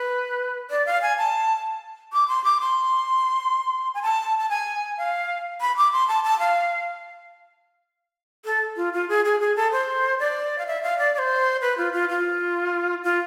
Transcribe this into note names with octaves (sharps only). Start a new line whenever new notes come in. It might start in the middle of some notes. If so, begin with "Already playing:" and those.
Already playing: B4
D5
F5
G#5
A5
D6
C6
D6
C6
G#5
A5
A5
G#5
F5
B5
D6
C6
A5
A5
F5
A4
F4
F4
G#4
G#4
G#4
A4
C5
D5
F5
E5
F5
D5
D5
C5
B4
F4
F4
F4
F4